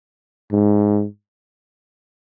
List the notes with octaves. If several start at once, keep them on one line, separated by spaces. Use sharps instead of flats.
G#2